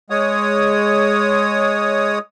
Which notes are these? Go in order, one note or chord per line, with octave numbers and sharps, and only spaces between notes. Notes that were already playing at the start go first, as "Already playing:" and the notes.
G#3 C#5 D#6